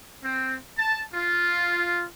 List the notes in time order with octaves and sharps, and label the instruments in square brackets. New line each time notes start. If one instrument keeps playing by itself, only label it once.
[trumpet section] C4
A5
F4